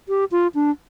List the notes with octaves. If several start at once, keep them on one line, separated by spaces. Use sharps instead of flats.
G4
F4
D4